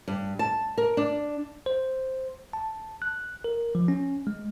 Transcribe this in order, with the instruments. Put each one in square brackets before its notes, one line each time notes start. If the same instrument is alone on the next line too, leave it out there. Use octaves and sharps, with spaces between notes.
[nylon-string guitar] G2
A5
A#4
D4
[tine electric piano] C5
A5
F#6
A#4
F3
C#4
G#3